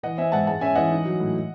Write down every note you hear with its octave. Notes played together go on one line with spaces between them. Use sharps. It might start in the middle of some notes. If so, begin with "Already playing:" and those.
E3 D#5 F#5
C4 E5 G#5
G#2 F#5 A5
G#3 F#5 A5
C#4 E5 G#5
E3 D#5 F#5
D#4
F#3
A2